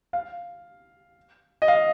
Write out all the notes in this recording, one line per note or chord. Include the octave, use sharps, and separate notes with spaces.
F5
D#5
F5